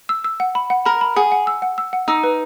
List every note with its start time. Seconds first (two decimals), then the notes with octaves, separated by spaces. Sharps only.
0.09 E6
0.24 E6
0.40 F#5
0.55 B5
0.70 F#5
0.86 A#4 B5
1.01 B5
1.16 G#4 F#5
1.32 F#5
1.47 E6
1.62 F#5
1.78 E6
1.93 F#5
2.08 D#4 E6
2.24 B4